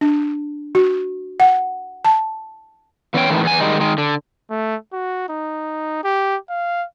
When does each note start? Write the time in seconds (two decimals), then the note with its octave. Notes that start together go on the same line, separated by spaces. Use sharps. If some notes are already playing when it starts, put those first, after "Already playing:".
0.01 D4
0.75 F#4
1.40 F#5
2.05 A5
3.14 E3 B3 C#4 C#5 G5
3.30 A2 D#3 E3
3.43 E2 B3 G#5
3.60 D#3 G3 G#3 D#4
3.80 D#3 G#3
3.98 D3
4.51 A3
4.93 F#4
5.29 D#4
6.04 G4
6.50 F5